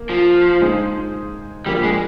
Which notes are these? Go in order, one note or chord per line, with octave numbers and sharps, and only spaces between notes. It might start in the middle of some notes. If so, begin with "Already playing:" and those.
Already playing: A#3
F3
G#3 D#4 G#4 C5
F3 G3 A#3 D4 G#4
G#3